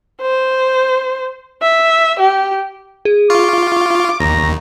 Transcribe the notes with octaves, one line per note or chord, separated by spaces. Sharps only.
C5
E5
G4
G#4
F4 C#6 D6
D#2 A#5